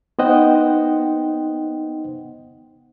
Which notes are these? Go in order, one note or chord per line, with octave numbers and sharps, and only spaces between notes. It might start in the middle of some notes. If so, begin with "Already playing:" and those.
B3 D#4 C5 D#5 F#5 G5